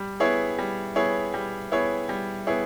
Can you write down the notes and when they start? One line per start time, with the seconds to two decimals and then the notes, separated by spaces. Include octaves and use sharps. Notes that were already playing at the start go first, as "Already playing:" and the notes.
Already playing: G3
0.20 B3 E4 G#4 C#5
0.59 G3
0.96 B3 E4 G#4 C#5
1.34 G3
1.71 B3 E4 G#4 C#5
2.09 G3
2.47 B3 E4 G#4 C#5